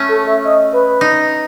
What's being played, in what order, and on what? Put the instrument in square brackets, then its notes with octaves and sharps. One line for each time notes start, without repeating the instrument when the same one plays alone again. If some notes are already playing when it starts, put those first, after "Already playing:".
Already playing: [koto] A3 C#4
[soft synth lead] A4
E5
D#5
B4
[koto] D#4